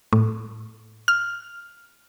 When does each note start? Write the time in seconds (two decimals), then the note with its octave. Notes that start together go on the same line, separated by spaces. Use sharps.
0.13 A2
1.08 F6